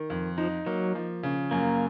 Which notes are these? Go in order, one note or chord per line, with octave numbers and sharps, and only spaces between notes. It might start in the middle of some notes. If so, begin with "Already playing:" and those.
Already playing: D#3
F2
F3 D#4
F#3 A#3
F3
C#3
F#2 A#3